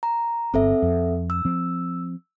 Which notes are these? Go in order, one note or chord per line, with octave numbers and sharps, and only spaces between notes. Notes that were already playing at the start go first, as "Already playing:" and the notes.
A#5
G1 C4 A4 E5
F2
E6
F3 C4